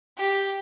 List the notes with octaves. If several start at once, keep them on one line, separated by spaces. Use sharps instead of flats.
G4